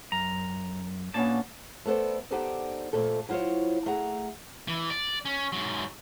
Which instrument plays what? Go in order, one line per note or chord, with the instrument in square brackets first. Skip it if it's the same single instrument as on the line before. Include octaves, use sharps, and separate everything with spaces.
[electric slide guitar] F#2 [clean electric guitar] A#5
[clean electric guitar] A#2 A5 [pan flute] A#3 [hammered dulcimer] B3 C#4 D4
[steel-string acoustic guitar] A3 B3 A4 C5 D5
B3 D#4 G4 A4 C5 D5
F2 A#2 A3 A4
F#3 E4 F4 C5 C#5
A3 G#4 F#5 A#5
[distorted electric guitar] E3
D5
C#4
G#2 F#3